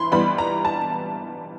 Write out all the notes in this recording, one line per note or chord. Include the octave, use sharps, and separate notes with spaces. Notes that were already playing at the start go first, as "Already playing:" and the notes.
Already playing: E3 B5 C6
E3 G3 B3 B5
A#5
A5